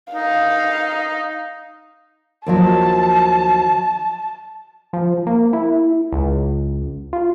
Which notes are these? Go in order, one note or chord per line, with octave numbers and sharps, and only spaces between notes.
D#4 F5
D#2 F3 F#3 A5
F3
A#3
E4
C#2
F4